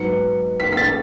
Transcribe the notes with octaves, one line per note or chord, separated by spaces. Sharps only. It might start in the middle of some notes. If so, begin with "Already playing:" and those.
Already playing: G#2 F#3 B3 C#7
B6
B6
A6